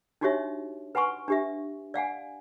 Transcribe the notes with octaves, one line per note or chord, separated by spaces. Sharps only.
D4 D#4 F#4 G4 C#5 E5
B4 F#5 G#5 C6 C#6
D4 G4 E5
D5 F5 F#5 G#5